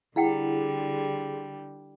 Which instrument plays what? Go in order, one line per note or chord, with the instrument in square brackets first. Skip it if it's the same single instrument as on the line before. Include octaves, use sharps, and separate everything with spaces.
[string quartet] D3 G3 [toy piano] E4 F#5 G5 [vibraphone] G#4